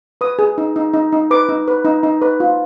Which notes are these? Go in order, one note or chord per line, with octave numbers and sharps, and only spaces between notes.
B4 D#6
G#4
D#4
D#4
D#4
D#4
B4 D6
D#4
B4
D#4
D#4
B4
F4